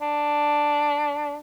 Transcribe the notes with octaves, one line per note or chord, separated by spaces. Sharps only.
D4